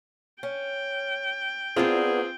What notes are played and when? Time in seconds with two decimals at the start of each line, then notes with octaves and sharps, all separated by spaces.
0.43 C#4 G5
1.76 B3 C4 D4 F4 G#4 A#4